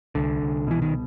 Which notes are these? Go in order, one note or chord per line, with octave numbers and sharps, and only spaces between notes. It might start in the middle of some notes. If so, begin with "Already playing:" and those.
C2 D3
C2
B2 E3
D#3